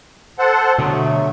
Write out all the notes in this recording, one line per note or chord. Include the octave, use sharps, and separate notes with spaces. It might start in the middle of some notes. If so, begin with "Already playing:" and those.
A4 C5 F#5
B2 D3 F#3 A3